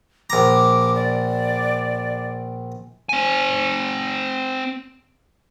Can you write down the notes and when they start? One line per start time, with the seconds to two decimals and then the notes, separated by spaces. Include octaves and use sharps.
0.30 A#1 A#5 D6
0.95 D5
3.09 C4 G#5